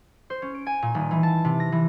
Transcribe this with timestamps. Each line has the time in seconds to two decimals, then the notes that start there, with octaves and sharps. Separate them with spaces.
0.30 C5
0.42 C#4
0.54 D7
0.67 G#5
0.82 A#2
0.95 D#1
1.11 E3
1.23 A5
1.45 C3
1.60 A#6
1.72 E3